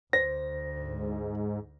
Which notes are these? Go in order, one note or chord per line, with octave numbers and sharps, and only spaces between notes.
D2 C5 A#6
G#2